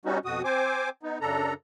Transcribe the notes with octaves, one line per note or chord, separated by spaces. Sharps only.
G3 B3 C#4 D#4 F#4
F2 B2 F#4 D#6
C4 C5 G#5 D6
B3 D#4
F#2 C#3 D4 A4 A#5